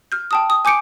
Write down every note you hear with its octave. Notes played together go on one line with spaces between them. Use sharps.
F6 G6
G5 A5 D#6
D#6
G#5 D6 G6 C#7 D7